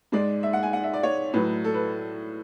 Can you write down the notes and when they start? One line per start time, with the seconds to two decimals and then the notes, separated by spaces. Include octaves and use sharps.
0.12 G#2 G#3 D5
0.43 E5
0.53 F#5
0.63 G#5
0.73 F#5
0.83 E5
0.94 D5
1.03 C#5
1.34 A2 F#3 B4
1.64 A4
1.74 B4